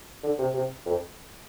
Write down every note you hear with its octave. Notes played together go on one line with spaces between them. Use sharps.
D3
C3
C3
F2